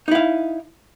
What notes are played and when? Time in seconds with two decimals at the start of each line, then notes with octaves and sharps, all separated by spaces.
0.08 D#4
0.11 E4
0.15 F5